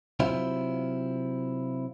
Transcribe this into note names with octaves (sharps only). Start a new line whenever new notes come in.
C3 F#3 C4 E4 F4